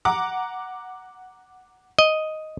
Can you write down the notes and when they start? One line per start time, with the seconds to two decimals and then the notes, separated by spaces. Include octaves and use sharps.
0.05 F#5 A#5 D6
1.99 D#5